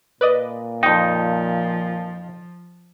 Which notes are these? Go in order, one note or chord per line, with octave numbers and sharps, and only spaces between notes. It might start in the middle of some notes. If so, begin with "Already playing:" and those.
A#2 B4 D5 D#5
F2 F3 D#4 G5